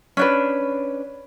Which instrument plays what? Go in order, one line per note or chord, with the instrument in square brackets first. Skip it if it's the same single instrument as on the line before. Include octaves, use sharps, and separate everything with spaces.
[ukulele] C#4 D4 B4